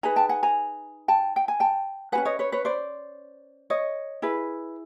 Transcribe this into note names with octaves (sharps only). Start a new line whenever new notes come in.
D#4 G#4 B4 G#5 A#5
G5 A5
F#5 G#5
G#5 A#5
G5 A5
G5
G#5
G5 A5
F#4 B4 F#5 G#5
C#4
C#5 D#5
B4 C#5
B4 C#5
C5 D5
C#5 D#5
E4 G#4 B4